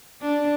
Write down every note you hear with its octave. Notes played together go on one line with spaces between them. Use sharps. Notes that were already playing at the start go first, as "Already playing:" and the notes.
D4